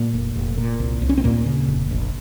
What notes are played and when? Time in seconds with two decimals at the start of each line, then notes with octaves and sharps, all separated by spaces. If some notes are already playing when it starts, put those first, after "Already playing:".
Already playing: A#2 A#3
0.13 F1
0.36 F1
0.58 A#2
0.80 C2
1.02 C2
1.09 C#4
1.18 C4
1.24 D#2 A#2 A#3
1.46 C#3
1.68 F1
1.91 A#1